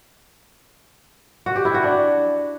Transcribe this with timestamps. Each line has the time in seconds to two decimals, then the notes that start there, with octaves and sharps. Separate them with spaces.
1.46 F#4
1.56 G4
1.65 E4
1.74 F#4
1.84 D4